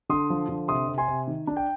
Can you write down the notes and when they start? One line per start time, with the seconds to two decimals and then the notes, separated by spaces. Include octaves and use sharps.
0.09 D3 C6 D#6
0.30 F3
0.49 D3
0.68 C3 C6 D#6
0.88 C3
0.98 G#5 C6
1.08 C3
1.28 D#3
1.47 D4
1.57 G5